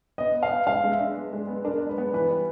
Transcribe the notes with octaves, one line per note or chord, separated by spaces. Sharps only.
B3 D#5
B3
F5
B3
G#3 F5
G#3
E5
D4
B3
G#3
B3
D4 A#4
D4
B4
B3
E3 B4
G3